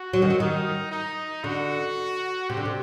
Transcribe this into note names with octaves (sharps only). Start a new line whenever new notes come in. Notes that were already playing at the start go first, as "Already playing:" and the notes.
Already playing: F#4
F#3
D#3
F#3
D#3 D#4
D#4
D3 F#4
C3 G4
D3
C3